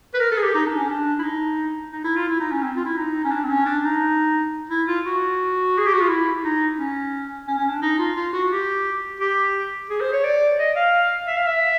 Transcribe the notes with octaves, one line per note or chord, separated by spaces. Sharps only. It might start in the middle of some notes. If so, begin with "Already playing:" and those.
B4
A#4
A4
G#4
G4
D#4
D4
C#4
D4
E4
D#4
D#4
E4
F4
E4
D#4
C#4
C4
F4
E4
D#4
C#4
D4
C4
C#4
D4
D#4
E4
F4
F#4
G#4
G4
F#4
F4
E4
D#4
C#4
C#4
C#4
D4
D#4
F4
F4
F#4
G4
G4
G#4
C5
C#5
D5
D#5
F5
E5
F5
E5